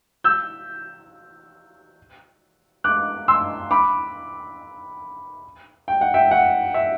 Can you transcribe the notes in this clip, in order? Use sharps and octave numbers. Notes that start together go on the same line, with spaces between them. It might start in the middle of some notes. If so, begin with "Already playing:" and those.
E6 G6
D6 F#6
C6 E6
B5 D6
G5
F#5
E5 G5
F#5
E5